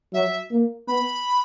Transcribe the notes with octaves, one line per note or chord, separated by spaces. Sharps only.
F#3 E5
A#3
B3 B5